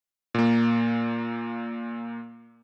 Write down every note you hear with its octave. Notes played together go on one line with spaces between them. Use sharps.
A#2 A#3